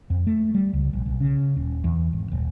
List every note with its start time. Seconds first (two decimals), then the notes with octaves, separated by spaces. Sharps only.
0.10 F2
0.27 A3
0.54 G3
0.73 C#2
0.93 A#1
1.06 B1
1.20 C#3
1.56 D#1
1.84 E2
2.13 G#1
2.32 D#1